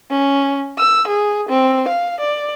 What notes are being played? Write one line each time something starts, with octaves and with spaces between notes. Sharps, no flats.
C#4
E6
G#4
C4
F5
D5